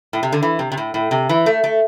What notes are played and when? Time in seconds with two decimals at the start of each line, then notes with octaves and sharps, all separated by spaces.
0.13 A2
0.23 C3
0.32 D3
0.43 E3
0.59 C3
0.72 C3
0.77 A2
0.94 A2
1.11 C3
1.29 E3
1.46 A3
1.64 A3